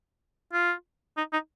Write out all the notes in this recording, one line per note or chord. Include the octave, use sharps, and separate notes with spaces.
F4
D#4
D#4